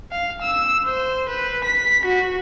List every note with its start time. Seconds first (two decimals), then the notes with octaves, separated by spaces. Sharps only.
0.12 F5
0.42 E6
0.84 C5
1.29 B4
1.65 B6
2.06 F#4